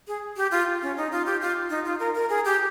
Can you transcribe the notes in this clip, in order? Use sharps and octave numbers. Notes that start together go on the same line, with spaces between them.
G#4
G4
F4
C#4
D#4
F4
G4
F4
D#4
F4
A#4
A#4
G#4
G4